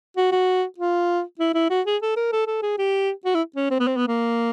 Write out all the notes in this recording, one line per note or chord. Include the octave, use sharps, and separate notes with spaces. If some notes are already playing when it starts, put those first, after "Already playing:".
F#4
F#4
F4
E4
E4
F#4
G#4
A4
A#4
A4
A4
G#4
G4
F#4
E4
C#4
C4
B3
C4
B3
A#3